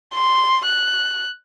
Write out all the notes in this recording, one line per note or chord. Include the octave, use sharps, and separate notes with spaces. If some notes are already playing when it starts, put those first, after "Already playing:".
C6
F#6